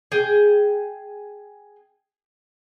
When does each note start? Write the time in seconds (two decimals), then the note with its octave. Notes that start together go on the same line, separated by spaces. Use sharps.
0.12 G#4 G5